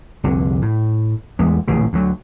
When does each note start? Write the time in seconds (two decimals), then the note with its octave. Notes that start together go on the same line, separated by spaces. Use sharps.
0.24 F1 C2 D3
0.62 A2
1.39 A1 E2 G#3 B3
1.68 D1 A1 A#2 C#3
1.93 D2 F#3